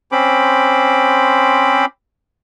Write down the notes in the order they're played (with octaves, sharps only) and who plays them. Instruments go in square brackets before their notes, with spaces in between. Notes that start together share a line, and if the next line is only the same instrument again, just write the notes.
[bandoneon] C4 C#4 C5 B5 D6